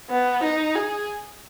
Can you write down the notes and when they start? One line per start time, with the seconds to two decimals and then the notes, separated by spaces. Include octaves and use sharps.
0.10 B3
0.43 D#4
0.75 G#4